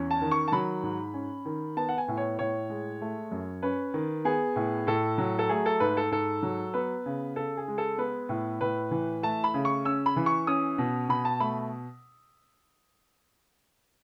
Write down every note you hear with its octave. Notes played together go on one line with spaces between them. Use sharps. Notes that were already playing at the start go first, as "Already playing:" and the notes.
Already playing: E2 C#4
A5
D#3
C#6
A5
F#3 B5
G#2
C#4
D#3
B3 A5
F#5
G#5
A2
C#5
A2 C#5
G#3
A3
F#2
C#4 B4
D#3
B3 G#4
A2
A2 A4
F#3
A4
A3 G#4
A4
G#2 B4
A4
G#2 A4
F#3
B3 B4
C#3
C#3 A4
G#4
G#3
A4
B3 B4
A2
A2 B4
E3
A3 A5
B5
C#3
C#6
C#4 E6
B5
E3
C#6
C#4 D#6
B2
B2 B5
A5
A3 B5